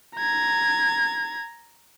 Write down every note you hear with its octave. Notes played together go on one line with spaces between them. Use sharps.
A#5 G#6